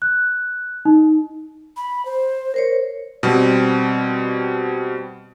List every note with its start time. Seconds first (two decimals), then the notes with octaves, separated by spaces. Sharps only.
0.02 F#6
0.85 D#4
1.77 B5
2.05 C5
2.54 A#4 C5 C#5
3.23 B2 G3 C4